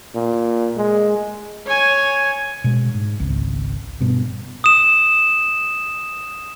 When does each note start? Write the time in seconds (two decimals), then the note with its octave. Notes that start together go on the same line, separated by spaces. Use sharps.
0.15 A#2
0.77 G#3
1.66 C#5 G#5
2.64 B2 G#3
2.94 G#2
3.19 G#1 C#2
4.01 G2 B2
4.64 D#6 E7